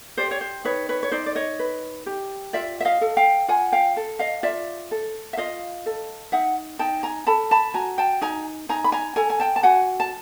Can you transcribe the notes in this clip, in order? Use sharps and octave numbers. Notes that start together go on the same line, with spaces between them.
G4 C5 D5
C#5
C5
D#4 B4 C#5
B4 C#5
C#5
D#4 C5 D5
D5
C#5 D#5
B4
G4
F4 D5 E5
E5
D#5 F5
A4
F5 G5
F4 F#5 G#5
F5 G5
A4
D#5 F5
F4 D5 E5
A4
E5
F4 D#5 F5
A4
D#4 E5 F#5
D#4 G5 A5
G#5 A#5
A4 A5 B5
A5 B5
F#4 G#5 A#5
G5 A5
D#4 G#5 A#5
D#4 G#5 A#5
B5
G#5 A#5
A4 G#5 A#5
G#5
G5 A5
A5
F#4 F#5 G#5
A5